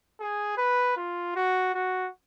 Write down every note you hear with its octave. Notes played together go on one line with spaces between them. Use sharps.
G#4
B4
F4
F#4
F#4